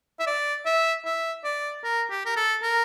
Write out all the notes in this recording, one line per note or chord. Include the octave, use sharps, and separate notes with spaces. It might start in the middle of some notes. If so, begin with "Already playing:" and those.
E5
D5
E5
E5
D5
A#4
G4
A#4
A4
A#4